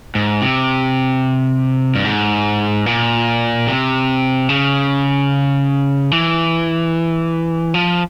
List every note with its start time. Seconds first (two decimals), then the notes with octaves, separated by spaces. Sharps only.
0.15 G#2
0.42 C3
1.95 G2
2.04 G#2
2.86 A#2
3.67 C3
4.49 C#3
6.11 E3
7.74 F3